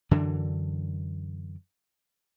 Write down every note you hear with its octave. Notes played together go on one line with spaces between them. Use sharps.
F#2 D3 E3 D4